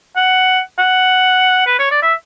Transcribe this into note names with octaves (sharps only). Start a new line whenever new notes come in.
F#5
F#5
B4
C#5
D5
E5